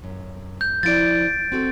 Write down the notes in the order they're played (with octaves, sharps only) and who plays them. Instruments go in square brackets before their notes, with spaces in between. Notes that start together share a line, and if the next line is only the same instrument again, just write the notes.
[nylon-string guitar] F#2
[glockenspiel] G6
[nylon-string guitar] F3 E4 D5 [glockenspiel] A6 D7
[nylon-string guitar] C4 F#4 A4